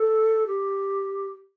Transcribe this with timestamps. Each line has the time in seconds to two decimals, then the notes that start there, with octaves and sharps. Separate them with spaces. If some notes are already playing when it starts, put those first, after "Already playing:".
Already playing: A4
0.47 G4